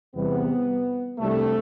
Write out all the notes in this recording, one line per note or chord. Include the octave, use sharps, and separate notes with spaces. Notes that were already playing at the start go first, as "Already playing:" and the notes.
E2 C3 G3 B3
C2 C3 G3 A3 D4